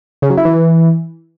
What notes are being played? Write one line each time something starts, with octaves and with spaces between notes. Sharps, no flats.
C#3
F#3
E4
E3